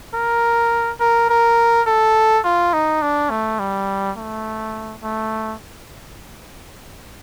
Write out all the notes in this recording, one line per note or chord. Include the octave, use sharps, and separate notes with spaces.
A#4
A#4
A#4
A4
F4
D#4
D4
A3
G3
A3
A3